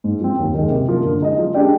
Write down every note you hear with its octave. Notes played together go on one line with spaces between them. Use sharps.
G#2
F3 C4
D#2
D#3 G#3
C3
F3 A#3
D3
G#3 D#4 G#4 D#5
F3
G#3 D4 G4 D5